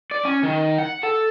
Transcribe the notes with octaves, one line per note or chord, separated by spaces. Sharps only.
D5
C#4
D#3
F#5
A4